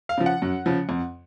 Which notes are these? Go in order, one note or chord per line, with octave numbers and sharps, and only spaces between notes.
F5
C#3 F3
F#5
F#2
C#3 F3
F2